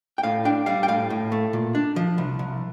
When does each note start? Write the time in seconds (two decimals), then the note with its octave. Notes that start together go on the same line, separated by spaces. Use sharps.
0.18 G5
0.23 A2 F5
0.45 D4 G5
0.66 G3 F5
0.83 G5
0.88 A2 F5
1.10 A2
1.32 A3
1.53 A#2
1.75 D4
1.96 F3
2.18 C2
2.39 C2